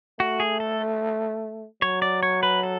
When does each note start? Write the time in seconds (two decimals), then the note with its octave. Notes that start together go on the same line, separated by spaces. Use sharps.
0.19 A3 F#4
0.40 G#4
0.60 A4
1.82 F#3 C#5
2.02 D5
2.23 C#5
2.43 B4
2.63 A4